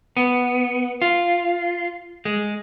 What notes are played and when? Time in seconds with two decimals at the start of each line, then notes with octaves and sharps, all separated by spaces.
0.17 B3
1.02 F4
2.25 G#3